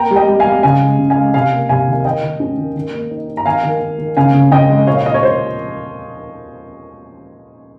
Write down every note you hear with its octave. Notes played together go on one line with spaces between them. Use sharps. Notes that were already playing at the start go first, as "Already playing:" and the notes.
Already playing: A#3 G5 A#5
G3
D#5 G5
G3
F5 G#5
G3
C#3 F5 G#5
G#3
C#3
F5 G#5
G#3
C3 F5 G#5
A#3
C3 F5 G#5
D#3
F5
D#3 D#5 G5
D#3
C#4
D#3
D#3
A#3
D#4
D#4
A#5
D#3 F5 G#5
D#3
D#3
D#3
C#3 F5 G#5
C#3
C#3 D#5 G5
G#3
A#2 C#5 F5
F5
A#2 D#5
C#5
A#2 C5